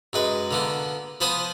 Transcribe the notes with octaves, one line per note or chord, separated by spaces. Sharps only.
F#2 G#3 B4
D3 A#3 B3
F3 B3 B4 C5 D#6